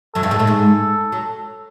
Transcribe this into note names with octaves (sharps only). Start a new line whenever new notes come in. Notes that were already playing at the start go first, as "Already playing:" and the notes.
F#2 F#3 A4
G2 G3
G#2 G#3
A2 A3
G#2 G#3
F#3